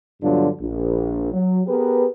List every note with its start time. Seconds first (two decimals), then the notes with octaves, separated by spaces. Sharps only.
0.21 G2 B2 D3 F#3 D4 F4
0.61 A#1
1.33 F#3
1.67 B3 G4 G#4 A#4 B4